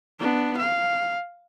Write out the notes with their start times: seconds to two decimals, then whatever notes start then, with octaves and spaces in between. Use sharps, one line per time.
0.19 B3 D4
0.57 F5